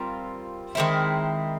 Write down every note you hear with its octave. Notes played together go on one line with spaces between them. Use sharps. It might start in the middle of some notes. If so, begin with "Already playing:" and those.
Already playing: G3 C4 F4 A#4
D#3 G#3 C4 E4